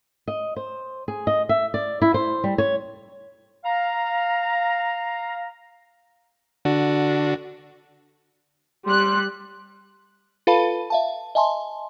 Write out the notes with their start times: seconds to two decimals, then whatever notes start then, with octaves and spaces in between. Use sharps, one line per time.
0.28 D#5
0.56 C5
1.08 G#4
1.27 D#5
1.49 E5
1.74 D5
2.02 E4
2.14 C5
2.44 G3
2.58 C#5
3.64 F5 A#5
6.65 D3 D4 F#4
8.86 G3 C6 F#6
10.47 F4 A4 B4 F5 A5 B5
10.90 E5 F5 A5
11.35 D#5 E5 G#5 A5 C6